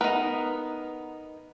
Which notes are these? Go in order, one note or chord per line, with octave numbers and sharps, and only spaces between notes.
B3 D#4 A#4 B4